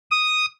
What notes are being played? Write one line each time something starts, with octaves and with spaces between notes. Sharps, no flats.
D#6